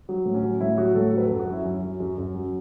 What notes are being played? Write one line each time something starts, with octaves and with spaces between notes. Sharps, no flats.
F#3
A2
C#4
F#3
A2 E4
F#3 F#4
A2 A4
F#3 B4
F#2 A4
F#4
F#3 E4
F#2 C#4
F#3
F#2
F#2
F#3